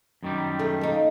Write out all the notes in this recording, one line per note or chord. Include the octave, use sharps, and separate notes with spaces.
F#2 D#3 G3
A3
A#3 D#4